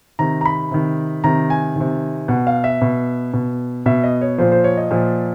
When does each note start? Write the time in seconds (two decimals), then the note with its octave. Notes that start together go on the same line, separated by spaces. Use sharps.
0.19 C3 D#3 A#5
0.41 A#5
0.45 B5
0.71 C3 D#3
1.24 C3 D#3 A#5
1.50 G#5
1.76 C3 D#3
2.28 B2 F#5
2.47 F5
2.64 E5
2.82 B2
3.34 B2
3.86 B2 E5
4.04 D#5
4.21 C#5
4.38 A#2 F3 C5
4.52 C5
4.64 C#5
4.77 D#5
4.91 A#2 F3